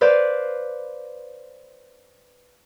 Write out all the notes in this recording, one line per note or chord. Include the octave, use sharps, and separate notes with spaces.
B4 C5 D5 F5